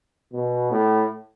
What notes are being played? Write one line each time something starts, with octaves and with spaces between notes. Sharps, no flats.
B2
A2